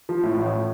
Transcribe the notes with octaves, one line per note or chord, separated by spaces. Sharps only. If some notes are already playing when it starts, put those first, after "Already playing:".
F3
A2
A1